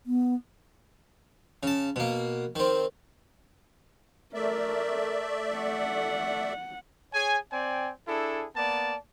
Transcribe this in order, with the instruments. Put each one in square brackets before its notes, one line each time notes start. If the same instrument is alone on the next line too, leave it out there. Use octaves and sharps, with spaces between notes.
[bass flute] B3
[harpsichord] C#3 A5
B2 A#3
D#3 C4
[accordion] A3 D5 E5 [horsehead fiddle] A#4
[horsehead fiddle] F#5
[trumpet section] G#4 C#5 G#5
C4 D5 G5 G#5
D4 E4 G#4 A4
A#3 B3 D5 A5